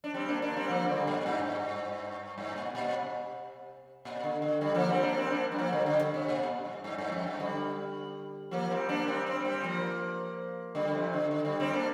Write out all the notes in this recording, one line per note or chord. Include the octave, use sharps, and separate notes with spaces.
D4
G3 C4
A#3 D4
A#3 D4
G3 C4
F3 A#3
D3 G3
A#2
G2
G2
A#2
A#2
C3
A#2
D3
D3
D3 G3
F3 A#3
G3 C4
A#3 D4
G3 C4
A#3 D4
G3
F3 A#3
D3 G3
D3 G3
D3
C3
A#2
G2
G2
G2
F2
G2
D3 G3
F3 A#3
G3 C4
A#3 D4
G3 C4
G3 C4
A#3
G3 C4
F3 A#3
D3 G3
G3
C3 F3
D3
D3
D3 G3
G3 C4
A#3 D4